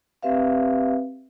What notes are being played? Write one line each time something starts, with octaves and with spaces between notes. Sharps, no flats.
C4 G4 B4 E5 F5